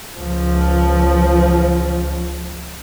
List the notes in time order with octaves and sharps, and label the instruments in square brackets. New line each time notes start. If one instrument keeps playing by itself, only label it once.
[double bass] C#2 F3